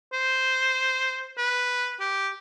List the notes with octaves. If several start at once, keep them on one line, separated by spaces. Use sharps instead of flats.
C5
B4
G4